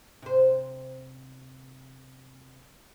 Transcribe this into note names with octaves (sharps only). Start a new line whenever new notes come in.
C3 C5